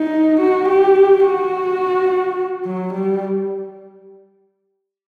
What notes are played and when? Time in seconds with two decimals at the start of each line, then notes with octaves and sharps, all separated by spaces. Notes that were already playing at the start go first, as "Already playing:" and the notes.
Already playing: D#4
0.40 F#4
0.69 G4
1.25 F#4
2.66 F#3
2.94 G3